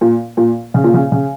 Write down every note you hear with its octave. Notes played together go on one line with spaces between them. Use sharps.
A#2
A#2
C#3
A#2
C#3
C#3